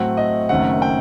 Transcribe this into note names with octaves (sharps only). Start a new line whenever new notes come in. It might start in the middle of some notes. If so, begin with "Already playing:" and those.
Already playing: A2 F#3 A3 C4 F#5
D#5
F#1 F#2 D#3 A3 C4 F#5
G5